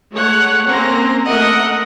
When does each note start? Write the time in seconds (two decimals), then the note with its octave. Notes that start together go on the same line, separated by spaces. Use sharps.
0.13 G#3 A3 C#5 F#5
0.66 A#3 C4 C#4 A#5 C6
1.30 A3 A#4 D#5 E5 F#5